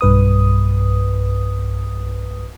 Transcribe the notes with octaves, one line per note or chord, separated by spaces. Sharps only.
B1 G2 B4 D#6